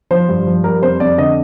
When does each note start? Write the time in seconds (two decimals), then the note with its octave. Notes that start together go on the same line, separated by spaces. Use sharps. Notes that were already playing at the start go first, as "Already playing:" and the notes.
0.11 F3 C5
0.29 G2
0.46 F3
0.64 G3 A#4
0.82 F2 C5
1.00 F2 D5
1.18 D3 D#5